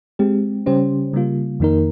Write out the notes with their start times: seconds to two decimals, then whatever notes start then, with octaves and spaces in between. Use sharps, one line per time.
0.19 G#3 C4 G4
0.66 C#3 G3 C#4 G4 C5
1.13 C#3 G3 A#3 F4
1.60 F2 D#3 A#3 D#4 A#4